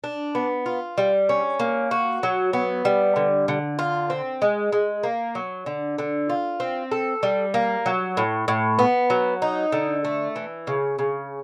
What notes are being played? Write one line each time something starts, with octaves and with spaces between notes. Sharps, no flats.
D4
B3
F4
G3
C#4
A#3
F#4
F#3
B3
G3
D3
D3
F4
C4
G#3
G#3
A#3
F#3
D3
D3
F4
C4
A4
G3
A#3
F#3
A2
A2
B3
F#3
D#4
D3
A3
E3
C#3
C#3